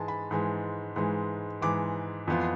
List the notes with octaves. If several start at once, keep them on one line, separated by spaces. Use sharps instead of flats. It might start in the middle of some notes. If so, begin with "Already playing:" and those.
Already playing: G#2 E3 G#3 G#5 A5
B5
G#2 E3 G#3
G#2 E3 G#3
G#2 E3 G#3 D6
F2 E3 B3 F4